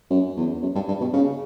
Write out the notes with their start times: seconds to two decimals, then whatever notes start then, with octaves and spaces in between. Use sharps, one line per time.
0.11 F#2
0.37 E2
0.62 F#2
0.75 G2
0.88 G2
1.01 B2
1.14 C#3